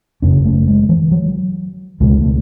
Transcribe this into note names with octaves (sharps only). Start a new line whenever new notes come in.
F#1 F#2 C#3 C#4
A3
G#3
E3
F#3
C#2 B2 G#3
A3